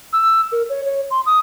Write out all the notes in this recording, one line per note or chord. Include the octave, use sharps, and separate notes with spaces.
E6
A#4
C#5
C#5
C6
D#6